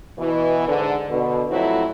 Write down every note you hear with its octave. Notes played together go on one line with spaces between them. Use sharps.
B2 E3
G#2 D3
B2 D3
F2 F#3 A3 C4 E4 F#4